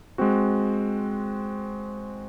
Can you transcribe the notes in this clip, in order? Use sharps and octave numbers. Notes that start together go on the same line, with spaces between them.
G#3 C4 F#4